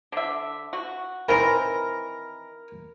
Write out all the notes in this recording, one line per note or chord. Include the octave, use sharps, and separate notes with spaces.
D3 E5
F#4
D#3 E3 C4 A#4